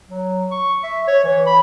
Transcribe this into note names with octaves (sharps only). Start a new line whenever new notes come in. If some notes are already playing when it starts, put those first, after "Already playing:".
F#3
C#6
E5
C#5
E3
B5